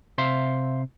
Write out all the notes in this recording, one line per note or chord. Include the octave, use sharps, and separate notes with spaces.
C3 C5 E5 F5 C6